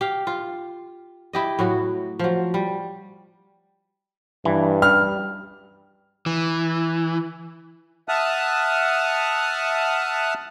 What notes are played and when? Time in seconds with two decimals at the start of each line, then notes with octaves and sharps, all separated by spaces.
0.01 G4 F5
0.27 F4
1.33 E4 G4 D#5
1.59 A2 F#3 F#4
2.19 F3 F#3
2.54 G3
4.45 G2 E3
4.82 G3 F6
6.26 E3
8.08 E5 F#5 A5 D#6 F6 F#6